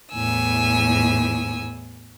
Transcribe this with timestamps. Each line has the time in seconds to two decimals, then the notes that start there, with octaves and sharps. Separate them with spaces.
0.14 E2 A2 G#5 E6